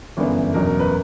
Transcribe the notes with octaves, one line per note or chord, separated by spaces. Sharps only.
G1 F#2 E3 B3 D4
F#1 E2 B2 F#3 C#4 A#4
A#4
B4